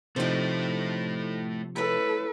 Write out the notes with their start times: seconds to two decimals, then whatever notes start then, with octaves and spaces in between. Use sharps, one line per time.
0.16 C3 F3 A3 D#4 E4 C5
1.76 A3 C#4 E4 A4 B4